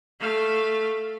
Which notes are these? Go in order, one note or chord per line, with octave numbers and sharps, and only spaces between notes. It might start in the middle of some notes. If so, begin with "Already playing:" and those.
A3 F5